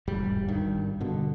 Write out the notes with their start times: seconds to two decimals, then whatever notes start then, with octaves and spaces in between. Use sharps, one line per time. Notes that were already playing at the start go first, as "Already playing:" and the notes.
0.08 E1 G#2 G3
0.48 G#1 G2 D#3
1.00 G2 B2 D3